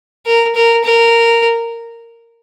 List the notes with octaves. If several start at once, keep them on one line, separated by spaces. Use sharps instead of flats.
A#4
A#4
A#4